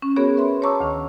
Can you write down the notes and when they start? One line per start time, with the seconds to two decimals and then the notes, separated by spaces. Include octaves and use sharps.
0.02 C#4
0.16 B3 F#4 G#4 A#4 C#5
0.37 B4 E5 B5 C6
0.62 C#5 A5 A#5 C#6 D6 E6
0.80 D2 D#3